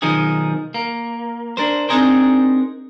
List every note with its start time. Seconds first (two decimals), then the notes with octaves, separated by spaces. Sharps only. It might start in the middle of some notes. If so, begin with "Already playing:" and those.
0.02 B1 D#3 F3 D#4 G#4
0.74 A#3
1.57 D4 A#4 C5
1.89 C4 D4 D#4 G#4 A#4 C5